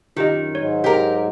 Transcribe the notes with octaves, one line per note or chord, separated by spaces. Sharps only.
F#2 D#3 F4 G4 D#5
G#2 F#3 G#3 C#5
G4 A#4